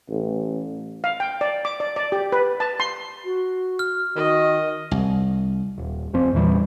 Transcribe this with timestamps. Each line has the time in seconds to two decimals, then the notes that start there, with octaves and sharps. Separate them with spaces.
0.10 A1
1.04 F5
1.20 G5
1.41 D5
1.65 D6
1.80 D5
1.96 D5
2.12 G4
2.32 B4
2.60 A5
2.80 C6
3.25 F#4
3.79 F6
4.16 D#3 F#4 D#5
4.91 C2
5.78 D#1
6.14 F1 F3 C4
6.33 E2 A#2 E3 G3